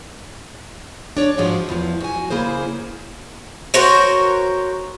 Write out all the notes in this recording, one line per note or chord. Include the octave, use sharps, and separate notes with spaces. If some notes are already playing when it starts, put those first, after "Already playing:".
D4 C#5 D5
G#2 F3 G#3 F4 F#4
E2 E3 F3
F#4 G#5
C#3 A#3 E4 G#4 C5
F#4 A#4 C5 C#5